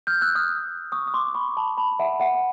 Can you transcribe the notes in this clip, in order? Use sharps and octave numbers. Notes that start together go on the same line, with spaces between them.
F6 G6
E6 F#6
D#6 F6
C#6 D#6
D#6
C6 D6
B5 C#6
A5 B5
A5 B5
E5 F#5
E5 F#5